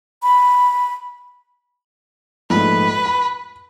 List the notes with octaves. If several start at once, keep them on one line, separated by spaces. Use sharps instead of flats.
B5
A#1 G#2 A3 B4
B5